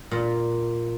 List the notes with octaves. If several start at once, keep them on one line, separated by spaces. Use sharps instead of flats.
A#2